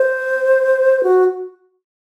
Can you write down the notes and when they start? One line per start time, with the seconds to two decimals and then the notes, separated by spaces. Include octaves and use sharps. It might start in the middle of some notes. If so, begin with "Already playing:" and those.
Already playing: C5
1.03 F#4